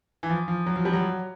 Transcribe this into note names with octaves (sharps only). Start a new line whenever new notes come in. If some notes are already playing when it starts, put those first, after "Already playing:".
E3
F3
F3
F#3
F3
G3
F#3